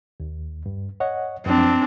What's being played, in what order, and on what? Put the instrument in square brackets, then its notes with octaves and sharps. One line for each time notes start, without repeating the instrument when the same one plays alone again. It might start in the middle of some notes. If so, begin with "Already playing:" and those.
[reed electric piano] D#2
G2
C#5 D#5 F#5
[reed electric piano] F#2 F3 [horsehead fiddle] C4 D4